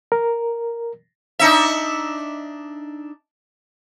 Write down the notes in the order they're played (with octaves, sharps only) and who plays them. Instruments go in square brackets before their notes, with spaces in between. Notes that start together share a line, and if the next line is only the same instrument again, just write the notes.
[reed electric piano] A#4
[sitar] D4 D#4 E5